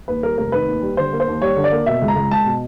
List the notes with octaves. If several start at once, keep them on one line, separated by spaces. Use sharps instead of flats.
D#2 B4
G3 A#4
F1 A#4
D#3 B4
D#2
G3
D3 C5
A#3
C5
D#2
G3 C#5
D3
D5
A#3
B2 E5
C#2
A#5
C#2
G#3 A5
B2